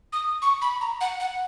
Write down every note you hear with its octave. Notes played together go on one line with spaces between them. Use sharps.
D#6
C#6
B5
A#5
F#5
F#5